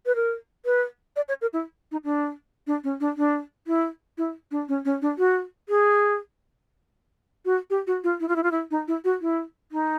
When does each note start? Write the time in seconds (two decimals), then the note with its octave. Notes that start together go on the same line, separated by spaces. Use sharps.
0.06 B4
0.15 A#4
0.65 B4
1.16 D5
1.28 C#5
1.41 A#4
1.53 E4
1.92 D#4
2.04 D4
2.67 D4
2.84 C#4
3.00 D4
3.17 D4
3.67 E4
4.18 E4
4.51 D4
4.68 C#4
4.85 C#4
5.02 D4
5.18 F#4
5.69 G#4
7.45 F#4
7.70 G4
7.87 F#4
8.04 F4
8.20 E4
8.28 F4
8.36 E4
8.43 F4
8.51 E4
8.71 D#4
8.88 E4
9.04 F#4
9.21 E4
9.72 D#4